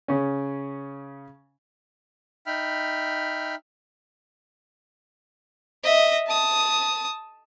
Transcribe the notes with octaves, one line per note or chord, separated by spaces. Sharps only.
C#3 C#4
D#4 E5 G5 B5 F6
D#5 E5
A5 D#6